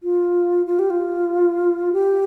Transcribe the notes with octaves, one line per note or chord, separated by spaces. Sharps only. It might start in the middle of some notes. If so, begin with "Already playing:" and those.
F4
F4
G4
F4
G4